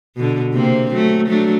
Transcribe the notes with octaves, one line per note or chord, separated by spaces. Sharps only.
B2 D3
C3 A#3 C4
F#3 A3
F#3 A3 D4